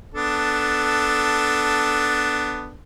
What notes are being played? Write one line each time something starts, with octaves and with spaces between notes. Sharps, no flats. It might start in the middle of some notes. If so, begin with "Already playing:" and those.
B3 D4 A4